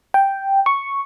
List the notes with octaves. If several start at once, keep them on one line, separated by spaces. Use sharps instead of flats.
G5
C#6